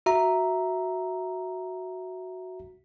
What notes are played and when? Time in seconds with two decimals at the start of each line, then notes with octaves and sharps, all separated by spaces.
0.06 F#4 E5 A#5